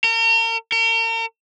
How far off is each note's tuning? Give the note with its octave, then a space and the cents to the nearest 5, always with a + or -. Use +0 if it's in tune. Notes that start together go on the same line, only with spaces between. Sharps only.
A#4 -40
A#4 -40